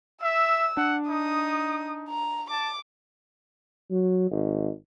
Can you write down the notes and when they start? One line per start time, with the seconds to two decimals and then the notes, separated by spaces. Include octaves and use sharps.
0.23 E5 E6
0.77 D4 F#5
1.09 D#4 D#6
2.09 A#5
2.50 A5 D6
3.91 F#3
4.31 G#1